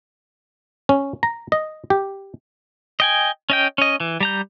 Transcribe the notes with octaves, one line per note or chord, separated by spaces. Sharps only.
C#4
A#5
D#5
G4
D#5 G5 G#5
C#4 D#5 G5
C#4 D#5
E3
G3 A#5 G6